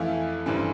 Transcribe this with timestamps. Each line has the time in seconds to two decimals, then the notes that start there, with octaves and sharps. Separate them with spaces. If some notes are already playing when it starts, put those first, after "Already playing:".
Already playing: F2 E3 A3 E4 F5
0.46 A1 G2 E3 A3 C4